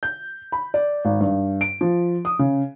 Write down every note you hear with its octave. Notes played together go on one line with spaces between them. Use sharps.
G6
B5
D5
G#1
G2
D7
F3
D#6
C#3